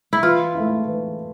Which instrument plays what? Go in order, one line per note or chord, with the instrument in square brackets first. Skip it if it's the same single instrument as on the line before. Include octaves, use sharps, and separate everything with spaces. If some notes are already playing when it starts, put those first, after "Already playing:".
[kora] E4
[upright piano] E3 [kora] F4
[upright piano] A3 E4
E3